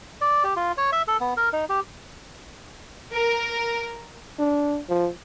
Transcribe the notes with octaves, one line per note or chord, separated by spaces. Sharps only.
D5
G4
F4
C#5
E5
A4
B3
A#4
D#4
G4
A#4
D4
F3